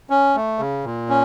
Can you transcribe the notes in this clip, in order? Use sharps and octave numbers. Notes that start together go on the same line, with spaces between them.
C#4
A3
C#3
A#2
C#4